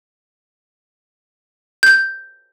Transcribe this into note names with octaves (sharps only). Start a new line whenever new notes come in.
G6